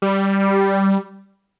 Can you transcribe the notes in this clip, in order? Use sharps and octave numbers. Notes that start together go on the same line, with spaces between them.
G3